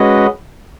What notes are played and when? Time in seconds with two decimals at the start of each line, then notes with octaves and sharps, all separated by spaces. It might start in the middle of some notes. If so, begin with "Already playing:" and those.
Already playing: G#3 C#4 F#4 B4 D#5